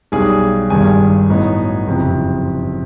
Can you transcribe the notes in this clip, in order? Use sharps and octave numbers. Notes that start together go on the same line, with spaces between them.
B1 B2 G3 G#4 G#5
G#1 G2 D#3 G3 G#4 G#5
A2 F#3 B3 D#4
F#1 F2 C3